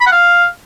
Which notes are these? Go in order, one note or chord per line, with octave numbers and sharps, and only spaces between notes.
B5
F#5
F5